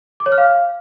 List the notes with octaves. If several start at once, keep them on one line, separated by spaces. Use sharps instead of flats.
D6
C#5
F6
F5